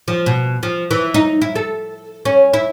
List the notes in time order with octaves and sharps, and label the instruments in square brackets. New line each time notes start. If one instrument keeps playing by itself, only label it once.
[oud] F3
B2
F3
E3
D#4
E4
A4
C#4
E4